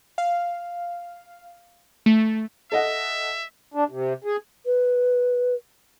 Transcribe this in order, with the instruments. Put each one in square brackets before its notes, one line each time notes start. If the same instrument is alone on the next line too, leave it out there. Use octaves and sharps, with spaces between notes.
[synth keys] F5
A3
[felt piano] A4 D#5 F#5 [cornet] E5
[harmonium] D4
C3
G#4
[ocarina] B4